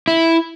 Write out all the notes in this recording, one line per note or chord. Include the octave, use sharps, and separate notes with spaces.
E4